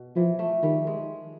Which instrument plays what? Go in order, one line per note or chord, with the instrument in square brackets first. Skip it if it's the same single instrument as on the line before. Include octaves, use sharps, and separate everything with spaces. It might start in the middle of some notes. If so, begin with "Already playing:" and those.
Already playing: [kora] B2
[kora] E3 [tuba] F3
[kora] A3
[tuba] D#3 [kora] G3
[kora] G#3